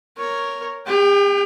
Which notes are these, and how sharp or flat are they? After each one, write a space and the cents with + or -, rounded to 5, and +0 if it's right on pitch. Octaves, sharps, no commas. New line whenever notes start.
A#4 +0 C#5 +0
G4 +45 G5 +0